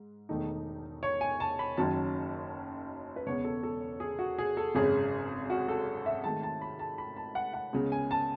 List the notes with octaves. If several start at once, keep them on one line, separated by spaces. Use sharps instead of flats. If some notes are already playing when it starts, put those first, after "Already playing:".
Already playing: G#2
E1 E2 D#3 A3 D#4
C#5
G#5
A5
B5
F#1 F#2 D#3 F#3 C#4 A5
B4
E1 E2 C#3 G#3 B3 C#5
A4
A4
G#4
F#4
G#4
A4
G#1 F#2 C#3 G#4
F#4
A4
E5
G#2 D#3 A3 A5
A5
B5
A5
B5
A5
F#5
F#5
C#2 C#3 G#3 B3
G#5
A5